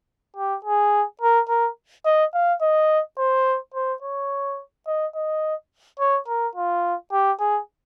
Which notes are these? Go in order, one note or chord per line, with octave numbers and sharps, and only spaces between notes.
G4
G#4
A#4
A#4
D#5
F5
D#5
C5
C5
C#5
D#5
D#5
C#5
A#4
F4
G4
G#4